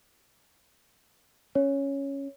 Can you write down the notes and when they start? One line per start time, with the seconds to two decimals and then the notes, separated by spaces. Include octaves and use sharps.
1.55 C#4 C#5